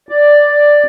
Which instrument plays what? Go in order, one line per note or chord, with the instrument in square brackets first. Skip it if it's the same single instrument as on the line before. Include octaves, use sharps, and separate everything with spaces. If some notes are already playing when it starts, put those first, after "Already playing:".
[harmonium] D5